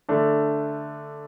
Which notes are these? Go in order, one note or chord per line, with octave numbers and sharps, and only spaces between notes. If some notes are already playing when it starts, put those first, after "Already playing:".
D3 A3 D4